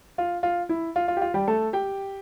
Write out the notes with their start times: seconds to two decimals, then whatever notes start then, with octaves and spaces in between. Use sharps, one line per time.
0.18 F4
0.43 F4
0.69 E4
0.96 F4
1.08 F4
1.17 G4
1.21 F4
1.34 G3 G4
1.48 A3 A4
1.73 G4 G5